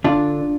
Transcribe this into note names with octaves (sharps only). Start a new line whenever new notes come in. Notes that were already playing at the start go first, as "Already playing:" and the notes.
D3 D4 F4